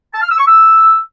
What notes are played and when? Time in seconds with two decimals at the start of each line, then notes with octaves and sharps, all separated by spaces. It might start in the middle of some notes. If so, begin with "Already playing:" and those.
0.14 A5
0.22 F6
0.30 E6
0.39 C#6
0.47 E6